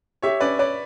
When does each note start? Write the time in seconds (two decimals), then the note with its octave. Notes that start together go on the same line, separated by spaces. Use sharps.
0.22 G4 C#5 E5
0.41 C#4 B4 D5
0.59 B4 C#5 D5